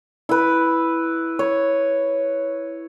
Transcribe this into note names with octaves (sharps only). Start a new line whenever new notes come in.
E4 B4
C#5